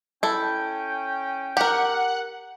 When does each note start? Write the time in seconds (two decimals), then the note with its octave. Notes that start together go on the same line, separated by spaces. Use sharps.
0.23 C#4 E4 A4 G5
1.57 G4 A#4 F#5